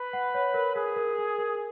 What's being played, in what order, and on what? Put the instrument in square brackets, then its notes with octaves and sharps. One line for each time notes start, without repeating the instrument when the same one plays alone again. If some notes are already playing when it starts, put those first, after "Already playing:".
Already playing: [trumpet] B4
[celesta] F#5
C#5
A#4
[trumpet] G#4 [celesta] A#4
[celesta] A#4
A#4
A#4